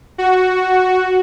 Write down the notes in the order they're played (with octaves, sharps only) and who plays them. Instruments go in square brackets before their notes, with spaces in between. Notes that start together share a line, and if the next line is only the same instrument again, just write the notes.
[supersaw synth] F#4